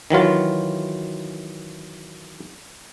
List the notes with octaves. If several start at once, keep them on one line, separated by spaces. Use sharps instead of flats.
D#3 E3 F#3 F4